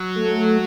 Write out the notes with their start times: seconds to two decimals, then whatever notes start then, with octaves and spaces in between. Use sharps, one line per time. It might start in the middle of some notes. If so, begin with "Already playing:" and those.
Already playing: F#3
0.16 A3